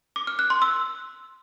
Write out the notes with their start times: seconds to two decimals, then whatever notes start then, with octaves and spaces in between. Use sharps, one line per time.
0.16 D6
0.27 F6
0.39 F#6
0.50 C6
0.62 E6